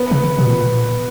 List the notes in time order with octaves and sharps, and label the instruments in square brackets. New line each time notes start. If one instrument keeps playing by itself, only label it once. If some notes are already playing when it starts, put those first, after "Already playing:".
Already playing: [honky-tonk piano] B3
[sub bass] C#3
B2
A#2